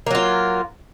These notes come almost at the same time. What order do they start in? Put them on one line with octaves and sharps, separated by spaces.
A#3 F#3 F4